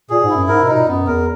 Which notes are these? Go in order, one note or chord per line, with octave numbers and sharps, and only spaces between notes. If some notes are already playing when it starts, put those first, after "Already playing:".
A#2 G#4
G#2
E4
F#2
G#2 A#4
B2
D#4
A#2
F#2 B3
E2 A#4